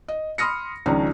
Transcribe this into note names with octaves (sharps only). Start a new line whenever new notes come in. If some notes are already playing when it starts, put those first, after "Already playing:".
D#5
B5 C6 D#6 F6 A#6 C#7
C#2 D#3 F3 C#4 D4 A#5